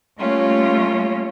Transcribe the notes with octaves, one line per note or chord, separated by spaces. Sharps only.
G3 A3 A#3 C#4 F4